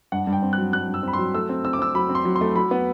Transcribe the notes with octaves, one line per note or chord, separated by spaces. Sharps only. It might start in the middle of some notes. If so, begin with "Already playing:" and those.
G2 F#5
G2
G5
C4
F#6
F#3
G2 F#6
G2
E6
C4 B5
C6
F#3
A3 E6
C4
C4 E6
D6
C4 E6
F#3 B5
C4
C6
F#3
C6
A3
F#3 B5
B3